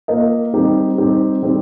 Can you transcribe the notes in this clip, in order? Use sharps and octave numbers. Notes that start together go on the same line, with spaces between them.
A#3 F4 A#4 D#5
G3 C4 D#4 G4
G3 C4 D#4 G4
G3 C4 D#4 G4